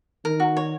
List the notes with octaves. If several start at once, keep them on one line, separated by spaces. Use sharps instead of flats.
D#3 A#4
F#4
C#5